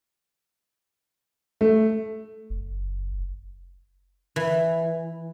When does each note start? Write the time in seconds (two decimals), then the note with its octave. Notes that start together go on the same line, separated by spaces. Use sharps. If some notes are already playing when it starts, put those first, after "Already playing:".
1.61 A3
2.50 F#1
4.36 E3